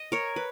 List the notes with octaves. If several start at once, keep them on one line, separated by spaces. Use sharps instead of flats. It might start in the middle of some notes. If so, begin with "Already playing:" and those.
Already playing: D#5
A#4 C#5
B4